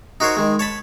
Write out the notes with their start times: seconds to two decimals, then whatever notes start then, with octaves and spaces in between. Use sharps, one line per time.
0.20 D#4 F#4 A#4 C5 C#5
0.37 D#3 G#3
0.59 C#5 A5 B5